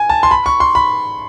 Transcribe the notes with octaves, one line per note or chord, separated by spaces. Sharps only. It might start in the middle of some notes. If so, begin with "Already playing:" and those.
Already playing: G#5
A5
C6
B5
C#6
C6
B5